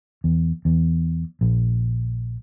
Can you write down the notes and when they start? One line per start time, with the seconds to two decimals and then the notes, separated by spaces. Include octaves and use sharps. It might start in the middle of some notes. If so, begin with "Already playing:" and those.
0.24 E2
0.65 E2
1.41 A#1